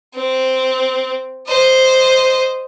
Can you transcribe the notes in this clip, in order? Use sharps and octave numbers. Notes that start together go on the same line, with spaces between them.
C4
C5 D#5